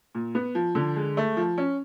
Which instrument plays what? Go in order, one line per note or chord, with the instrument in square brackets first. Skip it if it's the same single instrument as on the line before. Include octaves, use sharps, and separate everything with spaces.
[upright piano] A#2
B3
F3
D3
G#3
A3
F3
C#4